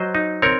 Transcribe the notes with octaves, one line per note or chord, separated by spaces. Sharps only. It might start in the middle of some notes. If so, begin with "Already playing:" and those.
Already playing: F#3 C5 D#5
D#4
C4 A#4 C#5